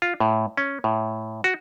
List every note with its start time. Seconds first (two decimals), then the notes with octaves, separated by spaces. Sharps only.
0.02 F4
0.20 A2
0.57 C#4
0.84 A2
1.44 F#4